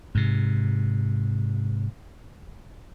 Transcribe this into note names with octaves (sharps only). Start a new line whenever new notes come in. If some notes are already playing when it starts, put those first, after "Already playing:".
G#2 C3